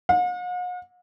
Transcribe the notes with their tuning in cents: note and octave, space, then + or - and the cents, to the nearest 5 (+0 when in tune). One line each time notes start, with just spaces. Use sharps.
F#5 -45